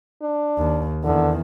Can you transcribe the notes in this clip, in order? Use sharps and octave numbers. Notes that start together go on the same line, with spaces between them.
D4
D#2
E2 D3 D#3